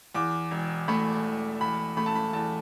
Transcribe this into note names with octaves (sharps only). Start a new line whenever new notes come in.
E2 D6
E1
A3 B5
E1
E2 B5
A3 B5
A5
B5
E2 A5